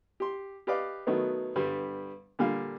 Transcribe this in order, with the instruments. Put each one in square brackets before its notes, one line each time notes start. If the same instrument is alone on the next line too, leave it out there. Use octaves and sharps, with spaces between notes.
[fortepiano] G4 C6
G4 B4 D5 D#5 F5 D6
B2 D#3 F#3 A3 B3
G2 D3 G3 B3
A#2 D3 G3 F5